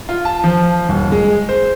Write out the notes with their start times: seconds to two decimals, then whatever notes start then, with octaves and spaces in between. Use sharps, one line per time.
0.09 F4
0.25 A5
0.44 F3
0.89 D#1
1.12 G#3
1.49 C5